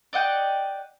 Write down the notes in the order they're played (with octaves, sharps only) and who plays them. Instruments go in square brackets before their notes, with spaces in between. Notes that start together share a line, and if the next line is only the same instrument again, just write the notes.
[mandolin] D5 D#5 F#5 G5